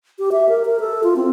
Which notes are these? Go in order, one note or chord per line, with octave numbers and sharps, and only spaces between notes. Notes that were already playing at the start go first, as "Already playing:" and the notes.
G4
E5
A#4
A#4
A4
F4
C4